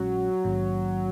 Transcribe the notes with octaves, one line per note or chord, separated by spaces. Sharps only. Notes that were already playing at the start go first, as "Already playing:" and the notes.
Already playing: A#1 A#2 F#3 G#3 C#4
A#1 G#2 D#3 A#3 C#4